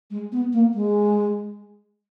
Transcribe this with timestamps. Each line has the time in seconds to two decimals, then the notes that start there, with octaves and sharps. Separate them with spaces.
0.11 G#3
0.32 B3
0.53 A#3
0.74 G#3